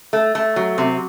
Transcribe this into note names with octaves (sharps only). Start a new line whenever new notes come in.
A3
A3
F#3
C3